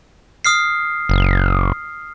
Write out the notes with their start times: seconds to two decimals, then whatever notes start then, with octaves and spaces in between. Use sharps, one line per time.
0.45 D#6 F6 C7
1.09 F#1